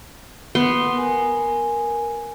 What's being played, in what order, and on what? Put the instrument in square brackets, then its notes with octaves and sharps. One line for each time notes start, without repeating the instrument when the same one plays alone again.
[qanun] B3 C6
[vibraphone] A#4 G#5